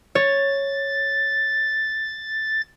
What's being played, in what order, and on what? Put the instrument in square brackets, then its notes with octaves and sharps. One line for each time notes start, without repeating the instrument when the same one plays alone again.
[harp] C#5 [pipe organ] A6